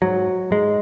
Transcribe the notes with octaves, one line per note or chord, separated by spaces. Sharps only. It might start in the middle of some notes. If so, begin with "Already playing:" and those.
G#2 F#3
G#2 G#3